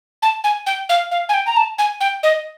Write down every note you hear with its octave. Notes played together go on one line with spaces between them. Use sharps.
A5
G#5
G5
F5
F5
G#5
G5
A#5
A5
G#5
G5
D#5